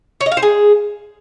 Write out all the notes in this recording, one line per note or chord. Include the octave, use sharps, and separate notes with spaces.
C#5
D#5
F5
C5
G#4